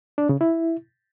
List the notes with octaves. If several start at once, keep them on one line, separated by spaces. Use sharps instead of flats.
D4
C#3
E4